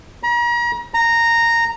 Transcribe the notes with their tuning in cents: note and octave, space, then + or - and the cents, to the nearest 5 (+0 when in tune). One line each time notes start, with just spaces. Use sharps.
A#5 +40
A#5 -10